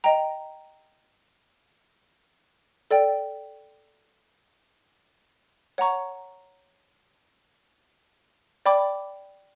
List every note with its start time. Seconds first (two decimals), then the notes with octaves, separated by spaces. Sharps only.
0.04 D#5 G5 A#5
2.91 A4 D5 G5
5.78 C#5 F#5 A#5 C#6
8.66 D5 G5 B5 D6